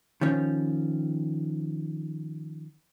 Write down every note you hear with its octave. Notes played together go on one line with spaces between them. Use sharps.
D#3 F3 C#4